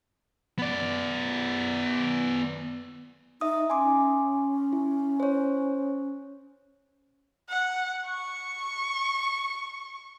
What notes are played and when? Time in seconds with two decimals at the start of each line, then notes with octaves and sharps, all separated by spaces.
0.59 B3 D5
3.41 D#4 E5 D#6
3.70 C#4 G#5 C6 D6
4.73 E4
5.20 C5 C#5
7.50 F#5
8.07 C#6